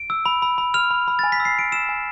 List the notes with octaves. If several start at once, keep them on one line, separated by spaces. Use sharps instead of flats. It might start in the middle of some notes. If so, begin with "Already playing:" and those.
Already playing: D7
E6
B5
B5
B5
F6 F7
B5
B5
G#5 A6
B6
E6
C7
B5 D7
E6 E7
G#5